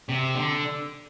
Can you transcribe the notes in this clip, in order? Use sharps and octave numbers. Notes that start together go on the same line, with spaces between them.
C3
D3